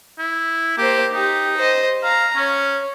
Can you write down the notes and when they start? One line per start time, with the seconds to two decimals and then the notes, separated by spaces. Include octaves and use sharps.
0.19 E4
0.78 A#3 G4 C5
1.13 D#4 G4
1.58 C5 D#5
2.04 F5 A#5
2.36 C#4 C#5